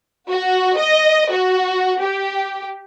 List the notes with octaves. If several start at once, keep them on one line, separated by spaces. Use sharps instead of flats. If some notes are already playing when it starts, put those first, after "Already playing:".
F#4
D#5
F#4
G4